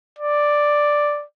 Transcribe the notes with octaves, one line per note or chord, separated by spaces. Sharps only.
D5